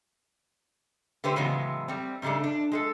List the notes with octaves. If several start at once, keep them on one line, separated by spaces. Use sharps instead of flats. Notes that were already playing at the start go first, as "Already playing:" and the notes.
D3 A3 G4 B4 C5
A2 C#3 E3 F#3 G#3 B3
G3 C4
G#2 C#3 G3 A3 D4
D4
G#3 G#4 A4